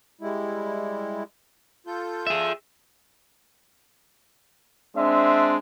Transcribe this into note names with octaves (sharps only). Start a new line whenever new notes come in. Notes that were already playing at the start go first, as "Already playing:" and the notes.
G3 G#3 E4
F4 A4 G6
G#4 E5
G#3 C4 D4 E5